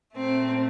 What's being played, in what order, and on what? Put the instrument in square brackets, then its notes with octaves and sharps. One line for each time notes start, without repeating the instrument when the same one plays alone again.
[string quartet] A#2 A3 C4